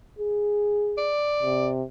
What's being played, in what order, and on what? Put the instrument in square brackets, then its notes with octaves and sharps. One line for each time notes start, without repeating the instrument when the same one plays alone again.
[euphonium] G#4
[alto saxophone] D5
[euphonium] C3